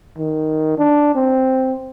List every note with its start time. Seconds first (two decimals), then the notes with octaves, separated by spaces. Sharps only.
0.18 D#3
0.78 D4
1.15 C4